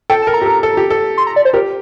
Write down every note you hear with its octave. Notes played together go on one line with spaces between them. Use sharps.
A4 G5
A5
A#4
A#5
G4
A4
A4
G4
A4
C6
A#5
D5
C5
G4 A#4